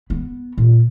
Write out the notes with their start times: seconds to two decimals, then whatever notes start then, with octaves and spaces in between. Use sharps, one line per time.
0.10 B3
0.58 A#2